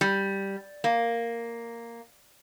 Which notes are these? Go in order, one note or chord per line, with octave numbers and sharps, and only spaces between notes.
G3
A#3